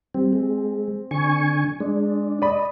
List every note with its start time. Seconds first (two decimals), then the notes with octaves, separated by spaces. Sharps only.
0.14 G3 C4
0.33 G#3
1.11 D3 G#5 C#6
1.80 G#3 D4
2.42 D5 D#5 B5